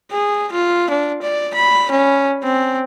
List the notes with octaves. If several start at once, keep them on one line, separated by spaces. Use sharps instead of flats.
G#4
F4
D4
D5
B5
C#4
C4